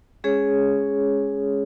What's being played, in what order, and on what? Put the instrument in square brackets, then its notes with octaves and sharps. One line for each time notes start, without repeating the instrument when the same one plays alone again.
[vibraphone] G#3 C#4 G#4 C#5